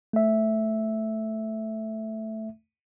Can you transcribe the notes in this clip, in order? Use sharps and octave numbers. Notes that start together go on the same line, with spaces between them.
A3 E5